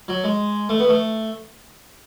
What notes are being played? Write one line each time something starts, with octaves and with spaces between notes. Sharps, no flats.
F#3
G#3
A3
B3
A3